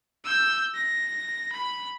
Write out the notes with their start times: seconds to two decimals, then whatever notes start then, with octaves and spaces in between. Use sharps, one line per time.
0.24 E6 G6
0.74 A#6
1.53 B5